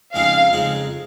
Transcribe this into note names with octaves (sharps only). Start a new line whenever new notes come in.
F2 C#3 G#3 C4 D#4 F5
F2 C#3 G#3 C4 D#4